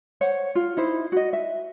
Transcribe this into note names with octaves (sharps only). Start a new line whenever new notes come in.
C5 C#5 F#5
F4
D#4 E4 C5
F#4 D#5
E5